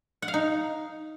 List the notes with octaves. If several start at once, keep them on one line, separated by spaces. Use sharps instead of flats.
F#5
F5
D#4